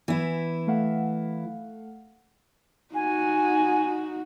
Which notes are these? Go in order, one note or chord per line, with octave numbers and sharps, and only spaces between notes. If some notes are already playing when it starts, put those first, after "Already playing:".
E3 B3 E4
A3 F5 F#5
D#4 F#4 G#5